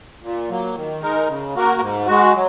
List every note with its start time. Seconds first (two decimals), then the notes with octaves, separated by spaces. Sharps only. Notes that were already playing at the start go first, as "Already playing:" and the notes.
0.23 A#2
0.49 F#3 A#3
0.76 D#3
1.02 G#3 D#4 A#4
1.28 C#3
1.55 A#3 F#4 A#4
1.81 G#2
2.07 G#3 F#4
2.34 F#3